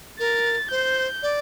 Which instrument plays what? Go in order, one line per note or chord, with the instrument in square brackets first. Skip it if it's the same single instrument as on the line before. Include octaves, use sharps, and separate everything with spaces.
[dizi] A#4 [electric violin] A6
[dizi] C5 [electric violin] G6
[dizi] D5